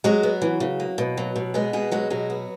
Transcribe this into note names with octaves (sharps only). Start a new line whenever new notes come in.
F#3 G#3 F#4
B3
E3
C#3
A#3
B2
F#3
B2
G#3 B3 G#4
B2 G#3 G#4
F#3 G#3 F#4
B2 F#3 F#4
B3